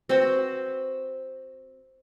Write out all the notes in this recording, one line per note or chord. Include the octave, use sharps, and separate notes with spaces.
C4 F#4 B4 C5